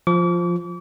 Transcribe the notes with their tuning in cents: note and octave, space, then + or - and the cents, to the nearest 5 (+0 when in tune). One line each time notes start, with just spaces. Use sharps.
F3 +0 D6 -40